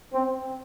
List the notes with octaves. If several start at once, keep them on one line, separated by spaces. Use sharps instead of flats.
C4